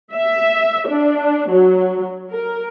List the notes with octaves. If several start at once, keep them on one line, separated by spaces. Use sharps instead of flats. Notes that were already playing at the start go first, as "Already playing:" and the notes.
E5
D4
F#3
A#4